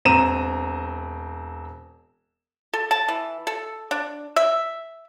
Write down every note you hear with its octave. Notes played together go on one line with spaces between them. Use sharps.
E1 C4 A#5 D#7 E7
A4
A5
E3
A4
D4
E5